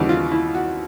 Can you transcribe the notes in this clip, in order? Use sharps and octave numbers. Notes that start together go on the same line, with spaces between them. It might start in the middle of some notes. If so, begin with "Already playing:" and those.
Already playing: D#2 C#3 E3 G3 F#4
F4
E4
F#4